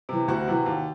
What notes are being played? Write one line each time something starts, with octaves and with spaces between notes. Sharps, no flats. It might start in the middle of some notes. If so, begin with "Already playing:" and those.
C3 E3
D2 F#4
C3 E3
D#2